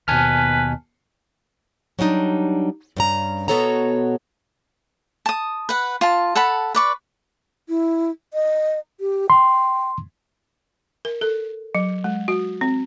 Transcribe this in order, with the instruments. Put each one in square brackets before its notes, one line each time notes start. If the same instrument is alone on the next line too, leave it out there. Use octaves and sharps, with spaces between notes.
[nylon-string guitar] D#2 B2 [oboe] B4 [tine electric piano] G#5 A5 F6
[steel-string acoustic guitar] F#3 G3 D4 D#4
G2 C#3 A#5
B2 B3 F#4 A4 C#5 A#5
[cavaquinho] A5 D#6
B4 F#5
F4 A5
A4 F#5 A5 B5
B4 D5 C#6
[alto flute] E4
D#5
G4
[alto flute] G5 [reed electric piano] C6
[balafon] A#4
A4
F#3
G#3
F#4
C4